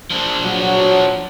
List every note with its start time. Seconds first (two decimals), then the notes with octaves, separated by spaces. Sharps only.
0.10 F3 D4
0.43 F#3